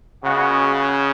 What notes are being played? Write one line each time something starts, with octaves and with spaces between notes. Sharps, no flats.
A#2 C#3 G#3 B3 F#4